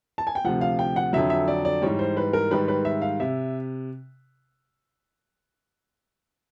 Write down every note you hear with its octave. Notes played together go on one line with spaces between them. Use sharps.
A5
G#5
G5
D2 C3 F3 F#5
F5
G5
F#5
F2 D3 F#3 E5
E5
D5
D5
G#2 E3 G3 C#5
C5
B4
A#4
G#2 D#3 G3 B4
B4
E5
F5
C3 E5